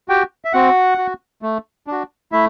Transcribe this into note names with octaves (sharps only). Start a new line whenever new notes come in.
F#4 G4 G5
E5
C4 F#4 F#5
F#4
A3
D4 F#4
A3 E4 E5